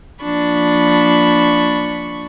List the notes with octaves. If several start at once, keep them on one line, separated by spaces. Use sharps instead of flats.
F3 A#3 D4 B5 C#6